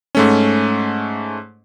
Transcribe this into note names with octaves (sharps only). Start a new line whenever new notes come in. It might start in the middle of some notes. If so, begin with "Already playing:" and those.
G#2 A3 C#4